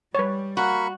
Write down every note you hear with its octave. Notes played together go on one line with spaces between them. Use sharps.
G3 B4 C#5
A#3 F#4 B5 C#6